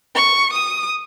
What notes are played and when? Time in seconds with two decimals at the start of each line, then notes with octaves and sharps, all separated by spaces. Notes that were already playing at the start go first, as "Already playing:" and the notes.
0.15 C#6
0.53 D#6